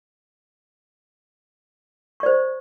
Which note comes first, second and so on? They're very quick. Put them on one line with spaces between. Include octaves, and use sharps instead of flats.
C#6 D5 C5